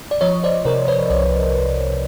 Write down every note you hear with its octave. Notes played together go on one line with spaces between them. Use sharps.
D5
F3 C#5 D#5
C5 D5
C3 A#4 C5
B4 C#5
C2 C5 D5
C2